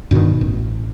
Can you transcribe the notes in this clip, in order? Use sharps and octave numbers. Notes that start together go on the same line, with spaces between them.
G2 B2 D3 D#3
A1